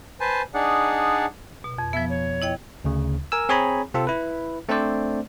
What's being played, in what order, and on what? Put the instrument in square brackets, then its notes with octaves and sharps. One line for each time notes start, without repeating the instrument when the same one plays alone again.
[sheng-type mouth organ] B4 C5 G#5 A5
D4 D#4 G#4 D5 F#5
[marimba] B2
F2
[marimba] F3 B3 [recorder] E5
[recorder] C#5
[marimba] E4 D#5 G5
[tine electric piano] D2 C#3
A#4 G#5 E6
C4 G#4 C#5 G#5 A#5 B5
C3 C4 F4 A4
E4 B4
A3 C4 D4 C5 D5